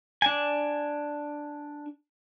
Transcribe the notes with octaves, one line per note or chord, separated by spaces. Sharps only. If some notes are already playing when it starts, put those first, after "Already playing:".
D4 G#5